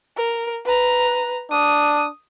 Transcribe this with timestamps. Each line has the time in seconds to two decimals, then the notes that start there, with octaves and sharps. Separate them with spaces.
0.17 A#4
0.65 B4 A#5
1.51 D4 D#6